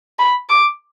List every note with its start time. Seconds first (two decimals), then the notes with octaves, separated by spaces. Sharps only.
0.19 B5
0.49 D6